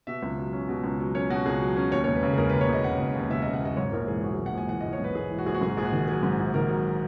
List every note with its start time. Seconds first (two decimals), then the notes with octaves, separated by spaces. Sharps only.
0.07 B2 E5
0.23 C#2
0.38 F#3
0.53 C#4
0.69 B2
0.84 C#2
1.00 F#3
1.14 C#4 C#5
1.30 B2 F#4
1.46 C#2 G#4
1.61 F#3
1.76 C#4
1.92 D#2 C#5
2.04 E1 C#5
2.15 B4
2.23 C#3
2.33 G#4
2.38 E1 A#4
2.49 D#2 B4
2.61 C#5
2.68 E1 D#5
2.84 C#3 F#5
2.99 E1
3.15 D#2
3.30 E1 E5
3.42 C#3 D#5
3.54 F#5
3.61 E1 D#5
3.77 G#2 C#5
3.92 A#1 A#4
4.07 E3 G#4
4.23 A#1 F#4
4.35 G#2 G#4
4.46 F#5
4.53 A#1 G#5
4.69 E3 F#5
4.81 A#1 D#5
4.93 C#5
5.00 G#2 B4
5.15 A#1 G#4
5.31 E3
5.38 F#4
5.46 A#1 G#4
5.54 F#4
5.61 G#2 G#4
5.70 F#4
5.77 A#1 G#4
5.85 F#4
5.92 D#3
6.08 F#3 G#4
6.23 G#2
6.39 A#1
6.54 D#3 A#4
6.69 F#3